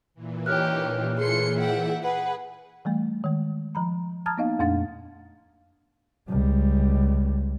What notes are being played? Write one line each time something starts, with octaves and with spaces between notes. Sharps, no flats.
A#2 E3
C#4 D#4 G4 C#5 F6 F#6
A3 G#4 C6 C#7
E5 F#5 G5
G#4 B4 F#5
E3 G3 A3
D#3 G#3
F3 A#5 B5
A5 A#5 D#6 F6 G#6 A6
A#3 B3 D#4 D#5 F5
F2 A#2 A3 D4 F5 A6
C#2 G3